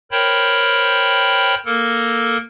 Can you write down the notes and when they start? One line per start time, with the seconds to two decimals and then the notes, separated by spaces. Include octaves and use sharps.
0.11 A#4 C5 C#5 G5 B5
1.65 A#3 A4 A#4